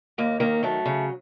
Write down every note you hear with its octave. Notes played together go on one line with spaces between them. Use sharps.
D#2 A#3
D#3 A#3
F#3 A3
C#3